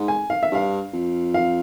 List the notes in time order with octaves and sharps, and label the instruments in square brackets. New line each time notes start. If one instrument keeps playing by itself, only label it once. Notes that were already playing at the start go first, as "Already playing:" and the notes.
Already playing: [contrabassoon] G#2
[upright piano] G#5
F5
E5
[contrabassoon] G2 [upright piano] F5
[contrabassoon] F2
[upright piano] F5